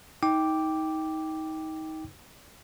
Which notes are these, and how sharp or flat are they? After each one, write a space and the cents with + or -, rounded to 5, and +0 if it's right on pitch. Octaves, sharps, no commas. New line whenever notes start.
D#4 +25 G5 +0 D6 +0